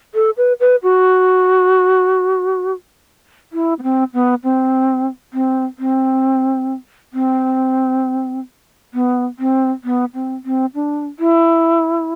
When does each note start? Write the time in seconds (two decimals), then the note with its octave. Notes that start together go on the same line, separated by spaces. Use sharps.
0.15 A4
0.37 B4
0.60 B4
0.83 F#4
3.53 E4
3.79 B3
3.83 C4
4.14 B3
4.44 C4
5.33 C4
5.79 C4
7.13 C4
8.94 B3
9.39 C4
9.84 B3
10.14 C4
10.45 C4
10.75 D4
11.19 E4